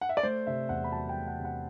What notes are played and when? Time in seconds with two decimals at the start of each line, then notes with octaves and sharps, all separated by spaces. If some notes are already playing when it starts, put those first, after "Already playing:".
0.01 F#5
0.09 E5
0.17 D5
0.23 A3 C5
0.47 C3 E5
0.69 E2 F#5
0.84 B5
0.92 F#3 A5
1.09 G5
1.15 A3
1.27 F#5
1.39 C3
1.45 F#5